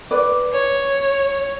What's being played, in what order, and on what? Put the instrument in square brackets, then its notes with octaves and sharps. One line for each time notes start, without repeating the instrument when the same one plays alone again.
[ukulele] B4 D5
[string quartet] C#5